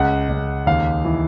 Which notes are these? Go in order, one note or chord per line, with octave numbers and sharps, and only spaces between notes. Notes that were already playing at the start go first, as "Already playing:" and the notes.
Already playing: C#2 F#5
C#2
D#2 F5
E3